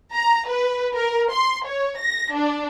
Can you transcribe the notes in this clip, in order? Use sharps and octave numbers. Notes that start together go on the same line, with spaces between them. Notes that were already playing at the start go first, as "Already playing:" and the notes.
A#5
B4
A#4
C6
C#5
A#6
D4